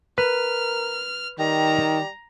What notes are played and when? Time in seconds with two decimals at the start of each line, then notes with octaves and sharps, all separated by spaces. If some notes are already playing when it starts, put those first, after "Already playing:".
0.18 A#4 B4 F6
1.39 D#3 G3 A#5